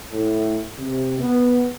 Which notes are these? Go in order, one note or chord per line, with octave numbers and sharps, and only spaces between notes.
A2
C3
B3